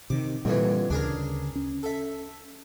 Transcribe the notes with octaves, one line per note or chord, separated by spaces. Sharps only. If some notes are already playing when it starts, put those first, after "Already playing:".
C3 D#3 D6
F2 A#2 D3 E3 G3
D2 C#3 D4 G#4 A#4
C#4
A4 E5